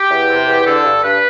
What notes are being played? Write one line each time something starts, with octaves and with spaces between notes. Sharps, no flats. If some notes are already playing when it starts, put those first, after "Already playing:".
Already playing: G4
E2
C3
E2
D3 A4
G2
G2 B4